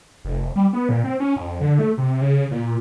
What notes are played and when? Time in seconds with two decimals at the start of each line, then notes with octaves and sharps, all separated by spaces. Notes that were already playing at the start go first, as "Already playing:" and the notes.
0.25 F1
0.56 G3
0.73 B3
0.89 A#2
1.04 C4
1.20 C#4
1.36 F2
1.61 D3
1.79 A3
1.98 C3
2.21 C#3
2.51 A#2